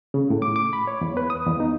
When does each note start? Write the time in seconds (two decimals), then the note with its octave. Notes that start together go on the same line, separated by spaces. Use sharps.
0.14 C#3
0.30 A2
0.42 D6
0.56 D6
0.73 B5
0.87 C#5
1.01 E2
1.17 B4
1.30 D#6
1.46 E2
1.60 D#4